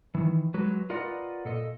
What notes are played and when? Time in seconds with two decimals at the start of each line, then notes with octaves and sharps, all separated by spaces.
0.15 D#3 E3
0.54 F#3 G#3 F#4 B4
0.90 F4 A#4 B4 D5 D#5 F#5
1.45 A#2 A4 D#5